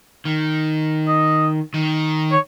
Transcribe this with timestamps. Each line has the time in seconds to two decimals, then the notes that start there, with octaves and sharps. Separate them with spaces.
0.25 D#3
1.08 D#5
1.74 D#3
2.32 C#5